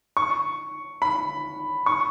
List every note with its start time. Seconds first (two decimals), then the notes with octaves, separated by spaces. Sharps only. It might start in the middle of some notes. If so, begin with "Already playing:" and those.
0.17 C#6
1.02 B5
1.86 C#6